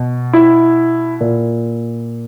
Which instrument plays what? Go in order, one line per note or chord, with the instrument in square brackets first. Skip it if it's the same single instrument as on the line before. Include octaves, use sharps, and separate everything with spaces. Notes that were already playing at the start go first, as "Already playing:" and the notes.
Already playing: [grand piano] B2
E4
A#2